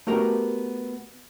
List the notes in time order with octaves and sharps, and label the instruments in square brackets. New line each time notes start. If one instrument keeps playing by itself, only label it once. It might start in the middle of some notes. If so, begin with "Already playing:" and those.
[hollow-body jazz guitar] A3 B3 F#4 G4 A#4